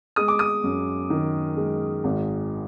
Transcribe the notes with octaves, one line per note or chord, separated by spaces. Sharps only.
G#3 D#6
D6
D#6
F#2
D#3
G#3
G#1